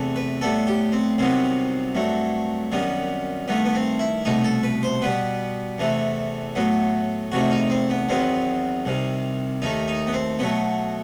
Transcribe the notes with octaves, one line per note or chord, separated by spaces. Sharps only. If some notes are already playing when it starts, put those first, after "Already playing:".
Already playing: E2 C3 E3 A3
B4
A2 G3 B3 A4
G4
C4
C2 C3 D#3 F#3 B3 C4
G2 F#3 A3
F#2 D#3 G3 B3
G2 D#3 A3 B3
B3
C4
E4
C2 B2 A3 D#4
A4
B4
C5
B2 G3 B3 B4
E2 C3 E3 A3
A2 F#3 B3
E2 C3 D#3 A3 F#4
D#4
C4
B3
E2 D#3 F#3 B3 C4
C2 C3 D#3
D#2 D#3 A3 D#4
D#4
B3
C4
B2 F#3 A3 B3